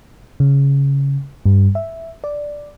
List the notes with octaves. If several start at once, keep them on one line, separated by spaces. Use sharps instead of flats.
C#3
G2
E5
D5